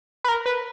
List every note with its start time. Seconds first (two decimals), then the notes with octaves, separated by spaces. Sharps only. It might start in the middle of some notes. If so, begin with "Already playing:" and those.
0.24 B4
0.28 A#4
0.46 B4